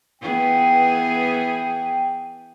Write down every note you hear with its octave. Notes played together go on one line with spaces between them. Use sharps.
E3 B3 G#4 G5